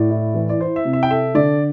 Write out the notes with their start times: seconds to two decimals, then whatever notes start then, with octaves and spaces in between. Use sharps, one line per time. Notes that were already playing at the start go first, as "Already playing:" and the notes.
Already playing: A2 D5
0.10 E4
0.34 E3
0.49 D5
0.60 E4 C5
0.76 E5
0.85 C3
0.93 E5
1.03 G5
1.10 A4 E5
1.34 D3 D5